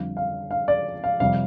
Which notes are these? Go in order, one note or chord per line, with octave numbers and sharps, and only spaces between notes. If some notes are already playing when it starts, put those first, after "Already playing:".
Already playing: F2 D3 G3 F5
F5
F5
D5
F5
F2 C3 G3 F5